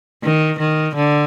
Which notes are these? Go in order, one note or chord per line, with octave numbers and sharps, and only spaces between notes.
D#3
D#3
D3